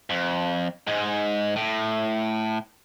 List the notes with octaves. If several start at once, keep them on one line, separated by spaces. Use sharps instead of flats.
F2
G#2 G#3
A2